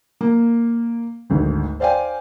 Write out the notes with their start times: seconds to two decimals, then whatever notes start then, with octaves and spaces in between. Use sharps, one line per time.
0.21 A#3
1.30 G#1 D2
1.80 C5 D5 F5 G5 G#5